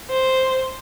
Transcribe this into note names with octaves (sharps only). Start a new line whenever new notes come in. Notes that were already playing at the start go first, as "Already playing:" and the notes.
C5